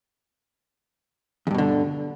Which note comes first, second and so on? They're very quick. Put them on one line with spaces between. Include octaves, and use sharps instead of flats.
E2 G2 B2 D3